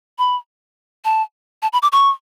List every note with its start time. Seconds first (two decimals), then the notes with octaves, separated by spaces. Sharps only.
0.19 B5
1.05 A5
1.62 A5
1.73 B5
1.82 D6
1.92 C#6